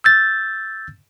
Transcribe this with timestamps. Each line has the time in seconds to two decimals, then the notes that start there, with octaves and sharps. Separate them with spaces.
0.04 E6 G6 A6